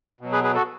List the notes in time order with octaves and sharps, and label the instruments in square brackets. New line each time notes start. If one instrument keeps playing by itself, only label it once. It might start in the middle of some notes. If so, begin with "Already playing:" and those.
[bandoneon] B2 F#3
G#4 B4
G#4 B4
F#4 A4